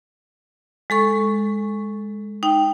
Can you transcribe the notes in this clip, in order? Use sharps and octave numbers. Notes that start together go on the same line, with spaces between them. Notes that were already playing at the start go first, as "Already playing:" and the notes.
G#3 A4 C#6
D#4 G5